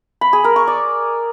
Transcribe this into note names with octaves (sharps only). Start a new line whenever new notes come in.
B5
G#4
A#4
C#6
D5